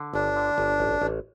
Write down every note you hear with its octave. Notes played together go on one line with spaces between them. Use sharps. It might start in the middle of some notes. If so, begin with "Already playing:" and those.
Already playing: D3
G1 D4
D3
G1
A1
A1